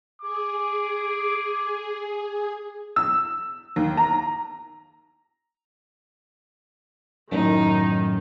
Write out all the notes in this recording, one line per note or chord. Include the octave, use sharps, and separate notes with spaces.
G#4 D6
E6
D#2
A#5
F#2 A2 D#3 D#4